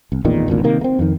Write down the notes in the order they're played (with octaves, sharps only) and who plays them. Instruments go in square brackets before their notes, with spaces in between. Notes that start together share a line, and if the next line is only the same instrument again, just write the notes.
[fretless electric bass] C2
A1 E2 A#2 D#3
G#1 D2 A#2
C3 D#3 A#3
A#3 C4
F2 D#3